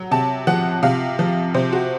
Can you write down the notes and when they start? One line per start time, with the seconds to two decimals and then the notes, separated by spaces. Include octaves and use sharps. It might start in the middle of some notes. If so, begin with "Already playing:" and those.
Already playing: F#3
0.11 C3 A5
0.47 F3 F#5
0.83 C3 F5
1.19 F3
1.54 C3 C5
1.73 F#4